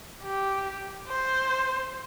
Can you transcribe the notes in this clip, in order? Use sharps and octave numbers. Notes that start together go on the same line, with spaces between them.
G4
C5